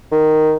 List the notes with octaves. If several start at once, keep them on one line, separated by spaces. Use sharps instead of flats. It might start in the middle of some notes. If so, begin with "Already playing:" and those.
D#3